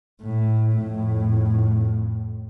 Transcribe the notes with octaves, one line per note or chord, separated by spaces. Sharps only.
A2
F2 A2